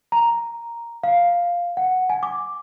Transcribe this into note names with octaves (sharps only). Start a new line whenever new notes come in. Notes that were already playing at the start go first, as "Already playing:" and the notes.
A#5
F5
F#5
G#5
D6